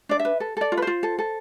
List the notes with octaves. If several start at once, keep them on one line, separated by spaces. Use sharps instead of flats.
D4 D5
E5
B4
A4
A4 D5
F4
B4
F4 C5
A4
A4